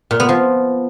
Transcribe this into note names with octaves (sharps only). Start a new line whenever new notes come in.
A#2
B3
F3